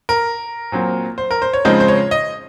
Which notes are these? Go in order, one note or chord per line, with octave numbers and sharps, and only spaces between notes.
A#4
A#2 F#3 C4
C5
A#4
C5
C#5
C#3 F3 G#3 C4 D#4 C5
C5
C#5
D#5